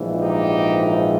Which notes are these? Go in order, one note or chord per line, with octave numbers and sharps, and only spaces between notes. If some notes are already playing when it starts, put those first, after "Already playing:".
Already playing: A#1 G#2 E3
D#4 G4